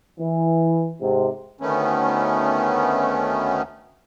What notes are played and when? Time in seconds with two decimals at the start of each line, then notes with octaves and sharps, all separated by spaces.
0.20 E3
1.01 G#2 C3
1.61 D2 D#3 A3 B3 C#4